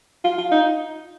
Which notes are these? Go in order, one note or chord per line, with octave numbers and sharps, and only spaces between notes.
F4
F4
D#4